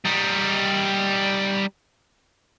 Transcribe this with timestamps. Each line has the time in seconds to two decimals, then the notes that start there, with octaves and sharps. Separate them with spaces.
0.05 G3 D#4